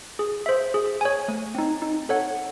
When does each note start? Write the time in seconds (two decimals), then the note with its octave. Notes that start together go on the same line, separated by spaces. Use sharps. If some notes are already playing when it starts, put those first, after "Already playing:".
0.19 G#4
0.46 C5 E5
0.74 G#4
1.01 C#5 G#5
1.28 A3
1.55 C4 D#4
1.82 D#4
2.09 A4 C#5 F#5